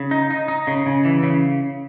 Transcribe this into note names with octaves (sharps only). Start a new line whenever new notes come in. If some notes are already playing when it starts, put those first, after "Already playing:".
Already playing: C#3
D#4
D#4
D#4
C#3
C#3
E3
C#3